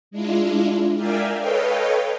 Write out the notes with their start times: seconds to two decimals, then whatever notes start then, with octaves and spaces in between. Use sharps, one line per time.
0.11 G#3 D4 E4 F4
0.95 A#4 D5 E5 F5 G5 G#5
1.39 A4 B4 C#5 D#5 F5 G5